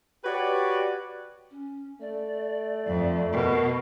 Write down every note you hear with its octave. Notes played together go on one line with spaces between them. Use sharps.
F#4 G4 B4 C#5 D5
C#4
A3 D5
F2
B2 A#4